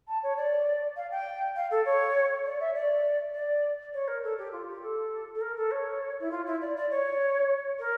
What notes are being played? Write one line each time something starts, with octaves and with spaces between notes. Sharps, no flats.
A5
C#5
D5
F5
G5
F5
A4
C#5
D5
E5
D5
D5
C#5
A#4
A4
G4
F4
G4
A4
A4
A#4
A4
C#5
E4
F4
E4
D5
D5
C#5
A#4